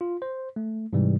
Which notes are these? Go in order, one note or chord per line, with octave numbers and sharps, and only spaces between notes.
F4
C5
A3
G#2 C3 E3 G3